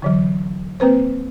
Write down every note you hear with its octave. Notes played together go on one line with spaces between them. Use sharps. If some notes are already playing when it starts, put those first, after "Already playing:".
D3 E3 F#3
A#3 C4 B4 C5